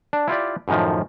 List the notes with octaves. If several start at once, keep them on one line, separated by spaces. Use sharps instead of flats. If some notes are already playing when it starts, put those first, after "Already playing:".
D4
E4 F4 G4 D5
F#2 A2 D#3 F3